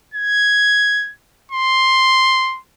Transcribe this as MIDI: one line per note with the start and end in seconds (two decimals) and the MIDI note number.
0.14 1.12 92
1.52 2.59 84